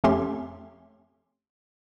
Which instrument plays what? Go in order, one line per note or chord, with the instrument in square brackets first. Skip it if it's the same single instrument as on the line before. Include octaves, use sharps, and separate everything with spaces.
[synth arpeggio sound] F2 A3 C#4 G4 C6